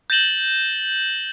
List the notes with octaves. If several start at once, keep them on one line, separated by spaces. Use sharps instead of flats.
G6 A6 A#6 E7 F#7 G7